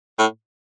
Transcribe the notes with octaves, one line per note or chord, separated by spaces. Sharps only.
A2